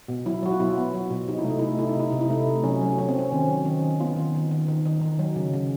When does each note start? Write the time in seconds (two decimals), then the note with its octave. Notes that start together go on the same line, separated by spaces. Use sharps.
0.08 B2
0.26 F#3 E4
0.43 F#3 F#4
0.53 F4
0.60 B2 E4
0.78 B3
0.94 F#3
1.10 B2
1.28 C3 D#4
1.39 E4
1.44 A3 D#4
1.59 A3 E4
1.69 D#4
1.79 C3 E4
1.89 D#4
1.96 C3 E4
2.10 C3 D#4
2.21 E4
2.30 A3 D#4
2.47 C3
2.64 F#3 C#4
2.81 F#3
2.98 F#3 C#4
3.09 C4
3.15 F#3 C#4
3.32 D#3 C4
3.48 F#3
3.65 D#3 C#4
3.82 D#3
4.00 B3 F4
4.16 D#3
4.34 D#3
4.51 D#3
4.68 D#3
4.85 D#3
5.01 D#3
5.19 F#3
5.36 C#3
5.53 C#3